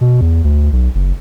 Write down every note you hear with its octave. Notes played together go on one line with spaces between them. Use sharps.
B2
E2
D2
B1
F#1